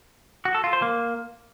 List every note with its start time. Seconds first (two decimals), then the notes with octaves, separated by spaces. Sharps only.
0.45 F#4
0.55 A4
0.64 F4
0.73 C5
0.82 A#3